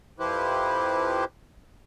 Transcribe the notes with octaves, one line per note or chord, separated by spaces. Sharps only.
F2 F3 E4 G4 B4 C5